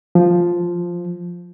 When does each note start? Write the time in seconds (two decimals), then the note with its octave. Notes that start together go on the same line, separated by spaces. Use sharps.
0.15 F3